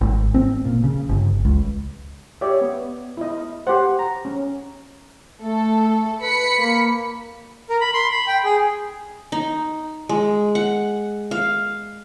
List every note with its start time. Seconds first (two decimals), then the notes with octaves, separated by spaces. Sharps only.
0.01 G#1
0.34 C4
0.65 A#2
0.84 C#3
1.09 G1
1.45 C#2
2.41 G4 C#5 D5 E5
2.61 B3
3.17 E4 D#5
3.67 G4 C5 F#5
3.99 A#5
4.25 C#4
5.42 A3 A4
6.21 B4 B5 B6 C#7
6.59 A#3
7.70 A#4
7.81 B5
7.94 C6
8.11 B5
8.27 G5
8.44 G#4
9.32 D#4
10.09 G#3
10.55 F#5
11.31 F5